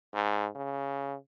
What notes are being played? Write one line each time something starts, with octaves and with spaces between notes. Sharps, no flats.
G#2
C#3